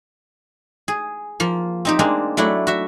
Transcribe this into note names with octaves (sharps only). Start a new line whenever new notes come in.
G#4
F3 A#3
C4 D#4 G4
G#3 A#3 C4 D4
F#3 A3 D4 E4
F#4 E5